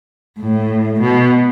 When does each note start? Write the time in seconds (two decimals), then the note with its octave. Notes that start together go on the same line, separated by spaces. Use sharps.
0.40 A2
1.01 B2